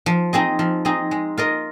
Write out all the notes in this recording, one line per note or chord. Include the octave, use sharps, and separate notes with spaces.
F3
C4 D#4 G#4 D#5
F3
C4 D#4 G#4 D#5
G#3
F4 A#4 D#5